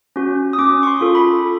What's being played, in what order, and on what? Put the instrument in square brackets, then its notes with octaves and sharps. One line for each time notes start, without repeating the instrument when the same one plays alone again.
[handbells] C#4 F#4
D#6
C#4 D6
C#6
C6
F4 A4
B5